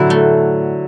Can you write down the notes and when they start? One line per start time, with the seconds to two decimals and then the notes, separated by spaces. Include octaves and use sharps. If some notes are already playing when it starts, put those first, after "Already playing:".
Already playing: A2 D3 F#3 E4
0.10 A3